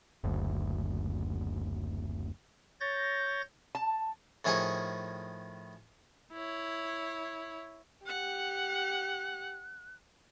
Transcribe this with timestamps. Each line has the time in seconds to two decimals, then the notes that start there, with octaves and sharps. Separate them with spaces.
0.24 F#1 D2
2.80 C#5 G6 A6 A#6
3.75 A5
4.45 A2 D#3 F3 G#4 G#5 C#6
6.33 E4 C#5
8.07 G4 F#5 F#6